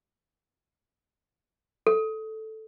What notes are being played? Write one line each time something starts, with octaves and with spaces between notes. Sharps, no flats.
A4